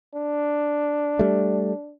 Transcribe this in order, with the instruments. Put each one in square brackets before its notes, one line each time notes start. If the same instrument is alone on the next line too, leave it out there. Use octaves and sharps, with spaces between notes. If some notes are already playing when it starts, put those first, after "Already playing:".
[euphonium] D4
[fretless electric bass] G3 A3